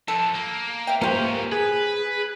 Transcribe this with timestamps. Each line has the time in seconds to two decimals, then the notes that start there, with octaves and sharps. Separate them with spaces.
0.08 F2 A4
0.35 A#3
0.87 E5 G5
1.02 G#2 A#3 B3 C#4 F4 G4 C5
1.52 G#4 B4